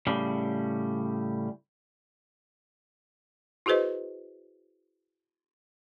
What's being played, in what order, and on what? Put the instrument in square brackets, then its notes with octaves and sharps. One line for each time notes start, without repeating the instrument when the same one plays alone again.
[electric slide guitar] A2 C#3 G3
[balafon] E4 F#4 G#4 B4 C5 D#5